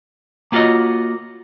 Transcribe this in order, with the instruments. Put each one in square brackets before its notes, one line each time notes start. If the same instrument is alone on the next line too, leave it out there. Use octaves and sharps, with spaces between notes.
[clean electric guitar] A#3 B3 F4 F#4 C#5 D#5